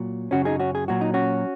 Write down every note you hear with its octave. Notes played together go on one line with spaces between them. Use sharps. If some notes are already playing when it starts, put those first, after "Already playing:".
Already playing: A#2 F#3
F#2 C#3 F#3 C#4 F#4
D#4 G#4
C#4 F#4
G#4
A#2 F#3 F#4
D#4
C#4 F#4